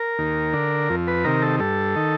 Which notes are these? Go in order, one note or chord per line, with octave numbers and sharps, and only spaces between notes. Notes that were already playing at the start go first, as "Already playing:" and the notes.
Already playing: A#4
D#2
D3
F2
B4
C3 D#3 A#4
A4
G2 A4
D#3